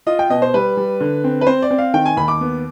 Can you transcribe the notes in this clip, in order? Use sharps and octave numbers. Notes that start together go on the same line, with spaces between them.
F4 D#5
G5
B2 D#5
C5
G3 B4
G3
D3
C4
B4
C4 C5
D5
C4
F5
D#3 G5
G#5
D#2 B5
D6
B3